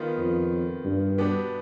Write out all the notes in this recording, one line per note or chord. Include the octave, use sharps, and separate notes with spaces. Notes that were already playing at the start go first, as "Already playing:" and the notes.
Already playing: D#3 B3 F4
F2
G2
B2 B3 D4 G4